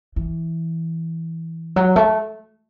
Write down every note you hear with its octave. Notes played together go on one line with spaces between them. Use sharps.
E3
F#3
A3